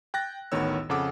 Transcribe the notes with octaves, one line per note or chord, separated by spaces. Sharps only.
G5 F#6 A6 A#6
A1 D2 D#3 B3 C#5 E6
F2 C#3 A4 F#5 D6 E6